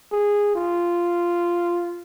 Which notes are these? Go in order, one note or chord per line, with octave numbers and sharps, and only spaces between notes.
G#4
F4